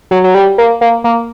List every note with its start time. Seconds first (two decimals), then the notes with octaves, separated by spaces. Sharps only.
0.11 F#3
0.24 F#3
0.35 G3
0.58 A#3
0.81 A#3
1.04 A#3